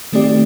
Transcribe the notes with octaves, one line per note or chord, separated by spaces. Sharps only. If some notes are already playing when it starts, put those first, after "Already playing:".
D#3 A3 C4 G4 D5